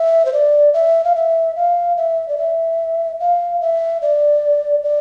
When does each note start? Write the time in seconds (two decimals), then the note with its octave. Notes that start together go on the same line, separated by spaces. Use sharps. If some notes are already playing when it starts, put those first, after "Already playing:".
Already playing: E5
0.25 C5
0.33 D5
0.74 E5
1.04 F5
1.15 E5
1.56 F5
1.97 E5
2.28 D5
2.38 E5
3.20 F5
3.61 E5
4.02 D5
4.84 D5